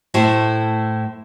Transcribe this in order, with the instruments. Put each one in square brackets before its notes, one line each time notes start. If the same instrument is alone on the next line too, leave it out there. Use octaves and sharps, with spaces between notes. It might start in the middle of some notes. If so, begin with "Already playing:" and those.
[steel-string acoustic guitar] A2 A3 E4 C5